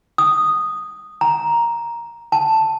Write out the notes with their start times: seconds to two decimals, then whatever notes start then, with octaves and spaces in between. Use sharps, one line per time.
0.18 D#6
1.21 A#5
2.32 A5